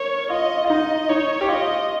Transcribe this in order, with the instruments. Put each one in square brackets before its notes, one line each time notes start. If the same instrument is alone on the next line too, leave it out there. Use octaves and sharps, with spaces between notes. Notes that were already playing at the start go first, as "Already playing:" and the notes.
Already playing: [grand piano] A#4 [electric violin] C#5
[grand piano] F4 [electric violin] D#5
[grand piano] F4
[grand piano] D#4 [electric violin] D#5
[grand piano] D#4 [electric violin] C#5
[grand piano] G4
[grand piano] F4 [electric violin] D#5